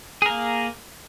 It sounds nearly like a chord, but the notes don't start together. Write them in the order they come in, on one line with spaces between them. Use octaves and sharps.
G#4 A#4 A#3